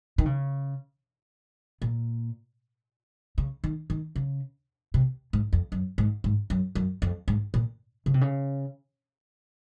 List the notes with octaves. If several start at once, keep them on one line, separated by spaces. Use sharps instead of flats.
D#3
C#3
A#2
C#3
D#3
D#3
C#3
C3
G#2
F2
F#2
G#2
G#2
F#2
F#2
F2
G#2
A#2
C#3
C3
C#3